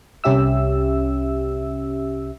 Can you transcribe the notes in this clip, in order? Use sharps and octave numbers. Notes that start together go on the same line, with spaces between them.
C2 C#4 G4 E5 E6